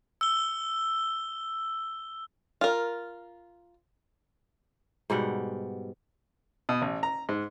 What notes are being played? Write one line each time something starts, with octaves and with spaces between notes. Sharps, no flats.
E6 G7
F4 A#4
G#2 B2 G3 F#5
B2
A1
A#5
G#2